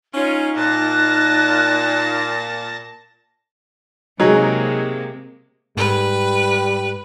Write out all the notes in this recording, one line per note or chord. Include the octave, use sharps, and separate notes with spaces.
C#4 D#4 F4
A#2 A5 F#6 A#6
C3 F#3 G#3 A#3 D#4 G#4
G#2 G3 B4